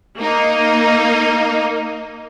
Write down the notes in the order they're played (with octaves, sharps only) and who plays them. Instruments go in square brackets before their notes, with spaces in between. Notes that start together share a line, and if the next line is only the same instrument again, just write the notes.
[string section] A#3 D#4